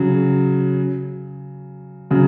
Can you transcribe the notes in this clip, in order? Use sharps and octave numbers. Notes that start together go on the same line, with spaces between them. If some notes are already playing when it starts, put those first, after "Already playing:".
Already playing: C#3 F#3
C#3 F#3